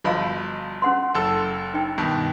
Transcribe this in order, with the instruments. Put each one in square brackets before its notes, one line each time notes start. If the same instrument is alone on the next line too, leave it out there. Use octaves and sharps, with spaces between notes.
[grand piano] G1 F3 B5 [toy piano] F#4 D#5 F5
[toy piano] C#4 F#5 C6
[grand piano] F#1 A4 E6
[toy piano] D#4 G5
[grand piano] G2 B2 D#3